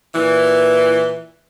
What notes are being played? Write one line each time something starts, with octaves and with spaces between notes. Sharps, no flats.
A#2 E3